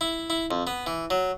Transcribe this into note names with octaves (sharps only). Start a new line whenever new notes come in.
E4
E4
F2
B3
E3
F#3